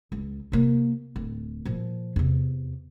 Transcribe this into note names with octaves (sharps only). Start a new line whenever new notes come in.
C#2
C3 A#3
D1
A#2 F3
E2 C3